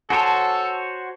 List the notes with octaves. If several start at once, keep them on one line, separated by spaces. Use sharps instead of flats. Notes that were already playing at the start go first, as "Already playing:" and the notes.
F#4 A4 C5 C#5 G#5 A5